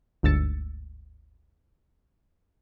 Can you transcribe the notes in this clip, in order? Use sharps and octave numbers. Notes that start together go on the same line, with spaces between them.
G1 D2 G#2 E6 A6 C#7